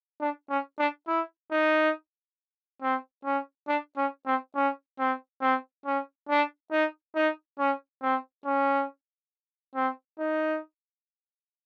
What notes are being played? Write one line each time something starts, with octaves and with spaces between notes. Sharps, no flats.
D4
C#4
D4
E4
D#4
C4
C#4
D4
C#4
C4
C#4
C4
C4
C#4
D4
D#4
D#4
C#4
C4
C#4
C4
D#4